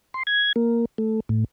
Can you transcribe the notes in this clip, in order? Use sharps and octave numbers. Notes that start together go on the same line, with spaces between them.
C6
G#6
A#3
A3
A2